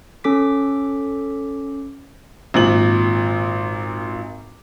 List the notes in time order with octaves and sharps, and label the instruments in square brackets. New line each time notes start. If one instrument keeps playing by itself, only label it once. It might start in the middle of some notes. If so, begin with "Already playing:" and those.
[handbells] C#4 A4 D6 B6
[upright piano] G#1 A#2 F#7